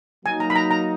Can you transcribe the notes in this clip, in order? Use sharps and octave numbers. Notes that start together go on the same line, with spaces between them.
F#3 A#3 D#4 G#5
A#5
B5
A#5
A#5